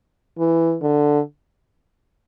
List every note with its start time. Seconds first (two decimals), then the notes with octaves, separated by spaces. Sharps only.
0.39 E3
0.82 D3